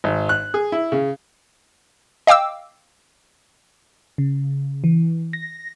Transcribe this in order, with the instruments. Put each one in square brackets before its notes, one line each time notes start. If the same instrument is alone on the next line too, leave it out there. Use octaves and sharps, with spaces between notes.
[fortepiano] G#1
F#6
G#4
E4
C#3
[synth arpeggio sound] D#5 F5 G5 D6 E6
[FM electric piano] C#3
E3
A#6